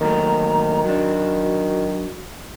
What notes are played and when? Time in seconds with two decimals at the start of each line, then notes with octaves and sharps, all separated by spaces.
0.01 D#2 D#3 F#3 A3 A#5
0.84 F#3 D4 F#4